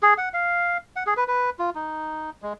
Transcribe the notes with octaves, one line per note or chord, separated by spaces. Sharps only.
G#4
F#5
F5
F#5
G#4
B4
B4
F4
D#4
G#3